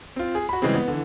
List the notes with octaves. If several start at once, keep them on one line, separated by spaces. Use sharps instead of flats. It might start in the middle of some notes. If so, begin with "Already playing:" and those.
C4 F4
G#4
F#4 B5
C#3 E3 G3 G#3 C4
B3
D3 E3